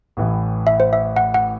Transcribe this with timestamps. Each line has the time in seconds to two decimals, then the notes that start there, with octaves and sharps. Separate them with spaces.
0.17 A1 A2 E3
0.67 E5
0.80 C5
0.93 E5
1.16 F#5
1.34 F#5